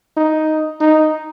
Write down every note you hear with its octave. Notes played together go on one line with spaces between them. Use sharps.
D#4
D#4